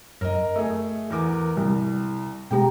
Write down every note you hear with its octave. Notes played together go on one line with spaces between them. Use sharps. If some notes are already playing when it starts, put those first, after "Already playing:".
F#2 A#4 D#5
A3 G#4
E2 A#4 D6
C2 G3
B2 G#3 G4 G5 A#5